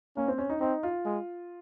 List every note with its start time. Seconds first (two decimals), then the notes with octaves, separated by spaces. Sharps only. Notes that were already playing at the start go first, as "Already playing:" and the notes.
0.17 A#3 C#4
0.28 C4
0.38 C#4
0.50 D#4
0.60 C4 D#4
0.83 F4
1.05 G#3